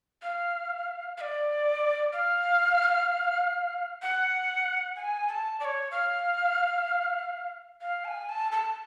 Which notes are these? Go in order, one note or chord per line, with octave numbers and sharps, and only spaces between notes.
F5
F5
D5
F5
F#5
G#5
A5
D5
C#5
F5
F5
A5
G#5
A5
A5